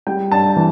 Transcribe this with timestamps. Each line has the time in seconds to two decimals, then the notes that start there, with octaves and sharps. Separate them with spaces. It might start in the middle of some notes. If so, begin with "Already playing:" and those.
0.07 G3 G5
0.31 G2 A5
0.56 E3